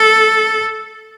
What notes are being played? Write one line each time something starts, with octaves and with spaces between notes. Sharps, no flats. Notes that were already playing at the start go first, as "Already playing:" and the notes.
Already playing: A4